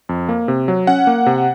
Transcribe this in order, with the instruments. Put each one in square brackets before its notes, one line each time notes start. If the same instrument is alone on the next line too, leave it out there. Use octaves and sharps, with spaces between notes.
[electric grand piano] F2
A#3
C3
F#3
C#4 F#5
A#3
C3